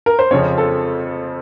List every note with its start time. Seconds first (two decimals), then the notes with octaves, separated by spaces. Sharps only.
0.06 A#4
0.19 C5
0.31 F2 C#3 F3 C4 C#5
0.58 A4